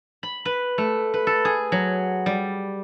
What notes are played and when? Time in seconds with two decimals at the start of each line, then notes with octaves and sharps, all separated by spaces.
0.23 B5
0.45 B4
0.78 A3
1.14 B4
1.27 A4
1.45 G#4
1.72 F#3
2.26 G3